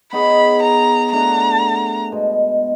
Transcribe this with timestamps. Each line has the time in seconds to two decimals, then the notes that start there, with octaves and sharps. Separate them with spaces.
0.13 B3 D#4 G#4 C#5 B5
0.62 A#5
1.12 A3 D4 F#4 A#4 A#5
2.12 B2 G#3